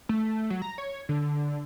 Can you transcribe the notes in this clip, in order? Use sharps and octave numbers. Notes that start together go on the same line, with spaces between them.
A3
F#3
A#5
C#5
D3